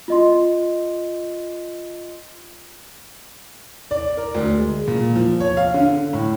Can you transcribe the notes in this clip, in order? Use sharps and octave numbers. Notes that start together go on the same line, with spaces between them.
F4 D#5 C6
D5
A#4
D2
G#3
A#2
F3
C#5
F5
D3
A2